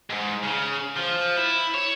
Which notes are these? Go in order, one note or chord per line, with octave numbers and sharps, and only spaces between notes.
G#2
C#3
F3
E4
C#5